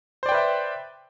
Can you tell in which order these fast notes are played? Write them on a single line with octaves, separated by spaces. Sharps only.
C5 D5 G5 B4 E5